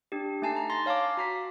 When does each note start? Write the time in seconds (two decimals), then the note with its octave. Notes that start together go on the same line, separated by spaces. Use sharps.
0.12 D4 G4
0.42 A3 D#4 G#5 A5 C7
0.57 A#5
0.70 A#5 C6 A6 A#6
0.86 C#5 F5 A5 A#5 D6
1.17 F#4 A#5 B6